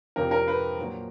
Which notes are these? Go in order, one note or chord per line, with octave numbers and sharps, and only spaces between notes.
F2 C3 F3 A#4
A#4
B4
A#2 F#3